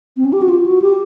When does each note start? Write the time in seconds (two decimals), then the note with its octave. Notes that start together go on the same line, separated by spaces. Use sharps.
0.17 C4
0.25 C#4
0.33 G4
0.42 F#4
0.49 F4
0.66 F#4
0.82 G4